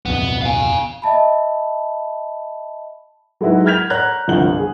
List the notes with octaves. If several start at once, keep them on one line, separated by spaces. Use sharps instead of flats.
D1 F2 B2 B3
F5 G#5
D#5 E5 A5 B5
F#3 G#3 D#4 E4 F#4 B4
F6 G6 G#6 B6 F7
C#5 F#5 A#5 F#6 G#6
G1 C2 F3 F4 F#5 F#7
G#4